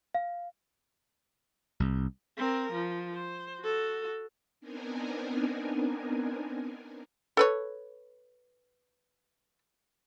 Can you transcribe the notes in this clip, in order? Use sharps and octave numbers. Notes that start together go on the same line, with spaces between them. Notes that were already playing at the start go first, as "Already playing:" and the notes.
F5
C2
C4 A#4
F3
C5
F#4 A4
B3 C4 D4 D#4 A#4 G#5
A4 B4 C#5